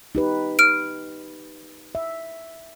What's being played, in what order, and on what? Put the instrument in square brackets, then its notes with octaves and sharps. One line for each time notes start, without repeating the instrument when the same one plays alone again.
[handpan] D#4 G4 B4
[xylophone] F6 D7
[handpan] E5